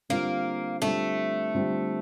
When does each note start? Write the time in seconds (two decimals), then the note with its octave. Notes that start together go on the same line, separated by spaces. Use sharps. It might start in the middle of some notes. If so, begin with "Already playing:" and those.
0.09 D3 G3 A#3 C4 F4
0.82 D3 G3 A3 C4 F4
1.55 D3 G3 C4 F4